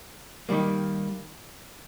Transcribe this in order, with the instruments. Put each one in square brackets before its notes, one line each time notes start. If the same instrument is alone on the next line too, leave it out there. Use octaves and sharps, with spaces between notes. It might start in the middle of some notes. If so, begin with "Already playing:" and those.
[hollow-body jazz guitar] D#3 G3 A#3